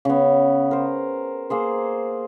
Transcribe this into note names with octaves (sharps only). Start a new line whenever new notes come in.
C#3 B3
A#4 C5
A#3 G#4 C5